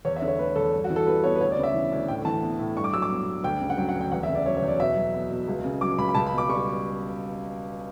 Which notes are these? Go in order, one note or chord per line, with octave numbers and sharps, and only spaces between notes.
E2 C#5
E5
D3
C#5
A3 B4
E2 A4
G2
F#4
E3
A4
G3 B4
B3 C#5
B4
D2 C#5
D5
C#3
E5
E3
D2
A2 G5
E3 A5
B3
A2
G2 C#6
D6
F#3 E6
D6
B3
G2
D2 G5
C#3
F#5
F#3 G5
F#5
D2
G5
E2 F#5
E5
C#3
D5
F#3 C#5
C#5
E2
D5
B2 E5
F#3
B3
B2
C#2
C#3
F#3 D6
C#2 B5
B5
C#2 A5
B5
B2
D6
G3 C#6